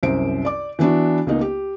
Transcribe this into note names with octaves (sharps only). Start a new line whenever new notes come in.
C2 F#2 C5 D7
D5 D6
E3 B3 D4 E4 F#4
C#2 A#3 B3 D#4
G4